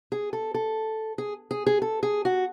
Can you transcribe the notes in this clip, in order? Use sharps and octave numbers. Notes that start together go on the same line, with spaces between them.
G#4
A4
A4
G#4
G#4
G#4
A4
G#4
F#4